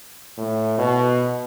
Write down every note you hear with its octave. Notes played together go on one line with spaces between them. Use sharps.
A2
B2